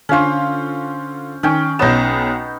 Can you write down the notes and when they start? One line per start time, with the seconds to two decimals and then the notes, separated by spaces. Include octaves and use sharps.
0.09 D3 C#4 F4 C5
1.43 D#3 C#4 G5
1.79 B1 B3 C#4 D#4 E7